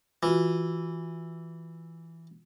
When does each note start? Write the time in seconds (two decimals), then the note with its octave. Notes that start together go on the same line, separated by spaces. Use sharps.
0.23 E3 F4 F#4